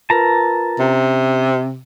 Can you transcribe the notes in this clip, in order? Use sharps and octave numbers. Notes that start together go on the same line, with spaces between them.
F4 A#4 B4 A5 A#5
C3 C#4